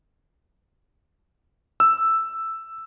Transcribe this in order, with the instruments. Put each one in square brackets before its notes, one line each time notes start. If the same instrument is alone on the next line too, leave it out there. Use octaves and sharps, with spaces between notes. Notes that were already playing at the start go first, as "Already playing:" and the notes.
[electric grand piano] E6